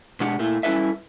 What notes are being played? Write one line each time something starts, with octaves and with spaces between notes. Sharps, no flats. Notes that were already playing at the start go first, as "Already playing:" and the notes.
B2 G#3 D4 G4 F#5
A#2 A3 E4
G3 C#4 E4 A4 B4 E5